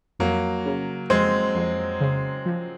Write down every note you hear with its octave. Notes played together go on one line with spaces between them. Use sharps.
F2 F#3 A#3
C#3
F2 G#3 C4
F2
C#3
F3